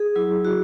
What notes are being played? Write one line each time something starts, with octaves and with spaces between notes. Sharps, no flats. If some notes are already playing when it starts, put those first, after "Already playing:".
Already playing: G#4
F#3 E4
F#4